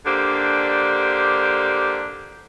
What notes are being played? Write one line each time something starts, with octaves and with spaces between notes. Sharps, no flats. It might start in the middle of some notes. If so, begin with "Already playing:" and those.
D3 A#3 D4 G4 C5